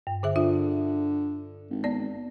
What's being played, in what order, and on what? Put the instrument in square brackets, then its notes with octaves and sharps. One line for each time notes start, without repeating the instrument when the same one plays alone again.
[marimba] G2
D3 G#4 E5
[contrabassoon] D3 [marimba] F4 E5
[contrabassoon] G#1
[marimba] B3 C4 D5